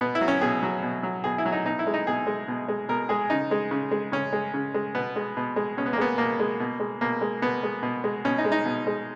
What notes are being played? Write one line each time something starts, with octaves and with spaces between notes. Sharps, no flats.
B2 B3
E4
F#3
C#4
B2 G#4
F#3
B2
F#3
B2 G#4
E4
F#3
D#4
B2 D#4
E4
G#3
D#4
B2 G#4
G#3
B2
G#3
B2 A#4
G#3 G#4
C#3 D#4
G#3
C#3
G#3
C#3 C#4
G#3
C#3
G#3
B2 B3
G#3
B2
G#3
B2 C#4
B3
A#3
G#3 B3
B2 A#3
G#3
B2
G#3
B2 A#3
G#3
B2 B3
G#3
B2
G#3
B2 C#4
D#4
G#3
D#4
B2
G#3